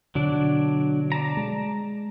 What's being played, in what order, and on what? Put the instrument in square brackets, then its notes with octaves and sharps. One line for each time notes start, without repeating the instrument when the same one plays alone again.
[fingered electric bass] B2 D3 [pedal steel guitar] F#3 D4 D5
[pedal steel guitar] D5 A5 A#5
[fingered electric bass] G#3